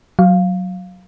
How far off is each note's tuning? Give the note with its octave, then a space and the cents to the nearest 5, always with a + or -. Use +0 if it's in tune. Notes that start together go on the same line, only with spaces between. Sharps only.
F#3 +0 F5 +0